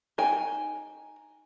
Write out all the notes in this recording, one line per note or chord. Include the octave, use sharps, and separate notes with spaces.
D#4 G5 G#5